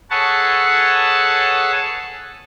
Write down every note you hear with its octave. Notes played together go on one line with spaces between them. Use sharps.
G#4 A4 B4 C#5 F#5 A5